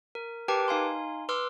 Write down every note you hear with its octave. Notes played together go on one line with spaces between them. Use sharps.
A#4
G4 A#4 B4 G5 A5 D6
D#4 F5 G#5 C6
B4 C6 D6 E6 F6